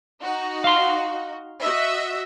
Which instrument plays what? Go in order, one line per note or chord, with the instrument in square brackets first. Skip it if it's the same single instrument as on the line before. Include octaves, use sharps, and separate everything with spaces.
[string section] D#4 F#4
[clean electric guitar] F5 C6
[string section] F#4 D#5 E5